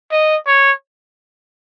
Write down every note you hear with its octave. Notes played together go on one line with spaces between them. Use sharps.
D#5
C#5